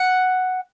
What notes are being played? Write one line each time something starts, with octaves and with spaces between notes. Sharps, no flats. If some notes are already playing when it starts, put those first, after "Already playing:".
Already playing: F#5